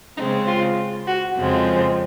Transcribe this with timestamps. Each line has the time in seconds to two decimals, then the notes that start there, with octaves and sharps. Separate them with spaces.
0.17 C#3 G#3 C4 D#4
0.47 F4
1.08 F#4
1.36 F2 C#3 F3 G#3 C4